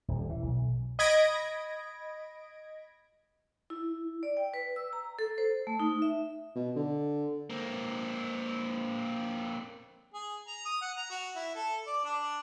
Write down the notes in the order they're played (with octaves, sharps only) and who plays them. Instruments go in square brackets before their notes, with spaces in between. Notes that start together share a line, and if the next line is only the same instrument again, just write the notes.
[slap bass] D#1
E3
B1
[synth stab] D#5 B5 G#6 A#6 D7
[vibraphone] E4
D5
G5
B4
E6
A#5
A4
C5
A3
D#4
E5
[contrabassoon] B2
D3
[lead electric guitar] A#3 C4
[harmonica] G#4
A#5
D#6
F#5
A#5
F#4
E4
A4
D5
D4